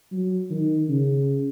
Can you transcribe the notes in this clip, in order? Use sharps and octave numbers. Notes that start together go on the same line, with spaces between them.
F#3
D#3
C#3